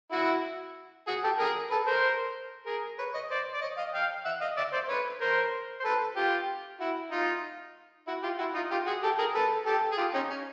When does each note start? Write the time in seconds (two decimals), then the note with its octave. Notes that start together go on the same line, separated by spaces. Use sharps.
0.11 E4 F#4
1.07 F#4 G#4
1.24 G4 A4
1.39 G#4 A#4
1.70 A4 B4
1.87 A#4 C5
2.66 G#4 A#4
2.99 B4 C#5
3.14 C#5 D#5
3.30 C5 D5
3.54 D5
3.61 C#5 D#5
3.77 D#5 F5
3.94 F5 G5
4.25 E5 F#5
4.41 D#5 F5
4.57 D5 E5
4.73 C5 D5
4.89 B4 C#5
5.21 A#4 C5
5.80 C5
5.84 A4 B4
6.16 F4 G4
6.80 E4 F#4
7.11 D#4 F4
8.07 E4 F#4
8.23 F4 G4
8.39 E4 F#4
8.55 D#4 F4
8.71 F4 G4
8.86 F#4 G#4
9.03 G4 A4
9.19 G#4 A#4
9.34 A4 B4
9.66 G4 A4
9.92 G#4
9.98 F4 G4
10.14 C#4 D#4
10.30 C#4